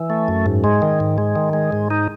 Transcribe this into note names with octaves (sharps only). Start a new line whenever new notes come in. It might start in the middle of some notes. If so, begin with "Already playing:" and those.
Already playing: E3
A3
F#2
G#2
G#3
D#3
G#2
G#3
D#3
G#3
G#2
D#4